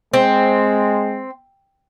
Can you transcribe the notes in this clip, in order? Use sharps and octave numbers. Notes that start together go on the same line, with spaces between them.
G#3 C4